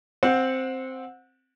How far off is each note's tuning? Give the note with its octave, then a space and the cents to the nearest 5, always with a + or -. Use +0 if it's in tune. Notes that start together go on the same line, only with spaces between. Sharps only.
C4 +0 F#5 -25